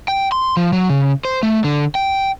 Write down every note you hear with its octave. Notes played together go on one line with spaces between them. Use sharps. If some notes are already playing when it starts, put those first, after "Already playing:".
G5
C6
F3
F#3
C#3
C5
A3
D3
G5